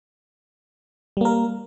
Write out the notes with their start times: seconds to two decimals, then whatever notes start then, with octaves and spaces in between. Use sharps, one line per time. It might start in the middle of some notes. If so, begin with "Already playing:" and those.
1.17 G3
1.21 A#3
1.25 A#4